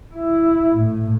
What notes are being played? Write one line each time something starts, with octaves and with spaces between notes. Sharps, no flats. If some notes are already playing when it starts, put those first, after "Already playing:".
E4
A2